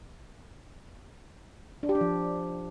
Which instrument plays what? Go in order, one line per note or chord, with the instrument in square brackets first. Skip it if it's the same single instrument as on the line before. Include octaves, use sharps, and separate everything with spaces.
[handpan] D4
G4
D4
F3